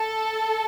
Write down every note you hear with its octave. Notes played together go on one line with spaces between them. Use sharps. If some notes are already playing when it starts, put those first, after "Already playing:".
Already playing: A4